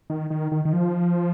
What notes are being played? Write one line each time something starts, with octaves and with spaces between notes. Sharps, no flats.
D#3
D#3
D#3
D#3
F3